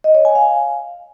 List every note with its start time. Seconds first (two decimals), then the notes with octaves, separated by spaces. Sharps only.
0.04 D#5
0.15 C#5
0.25 G#5
0.35 F5